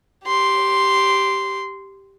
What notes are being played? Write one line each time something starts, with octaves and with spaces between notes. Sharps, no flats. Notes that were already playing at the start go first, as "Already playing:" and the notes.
G4 C6